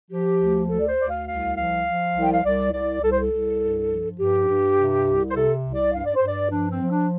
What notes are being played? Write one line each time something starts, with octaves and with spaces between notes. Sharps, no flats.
F3 G4
D2
D2 A4
D5
C5
D2 D5
F5
C2 F5
F3 F5
F3
C2
G5
F5
C2 D5
C2 D5
C2 A4
C5
A4
C2
G2
F3
G2 G4
G2
C3
C2
C5
C3 A4
C2
D5
G2 F5
D5
C5
G2 D5
F3 D4
C4
F3
D4